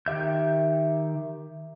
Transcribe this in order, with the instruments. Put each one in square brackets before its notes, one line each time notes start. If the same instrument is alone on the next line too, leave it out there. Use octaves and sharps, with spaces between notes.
[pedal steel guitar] D#3 G4 E5 G6